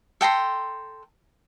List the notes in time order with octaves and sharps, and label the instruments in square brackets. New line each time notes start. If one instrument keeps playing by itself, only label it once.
[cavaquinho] A4 G5 A#5 C6